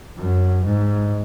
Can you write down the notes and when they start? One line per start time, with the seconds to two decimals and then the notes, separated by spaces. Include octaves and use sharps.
0.18 F#2
0.66 G#2